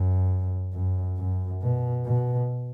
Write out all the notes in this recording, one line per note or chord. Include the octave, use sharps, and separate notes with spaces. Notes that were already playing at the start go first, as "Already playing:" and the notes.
Already playing: F#2
F#2
F#2
B2
B2